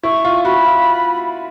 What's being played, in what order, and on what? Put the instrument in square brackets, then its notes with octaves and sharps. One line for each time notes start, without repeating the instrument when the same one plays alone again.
[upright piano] E4 [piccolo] C#6
[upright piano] F4
[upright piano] F#4 [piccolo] B5
[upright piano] F4